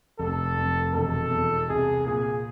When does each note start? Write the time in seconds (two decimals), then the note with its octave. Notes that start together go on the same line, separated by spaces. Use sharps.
0.19 F1 A4
0.57 F2
0.94 E1 A4
1.31 E2
1.69 C2 G#4
2.06 A#2 G#4